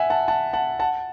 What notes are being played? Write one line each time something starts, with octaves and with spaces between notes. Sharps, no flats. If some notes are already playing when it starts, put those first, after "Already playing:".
Already playing: E5 F#5 G#5
F#5 A5
F#5 A5
F#5 A5
F#5 A5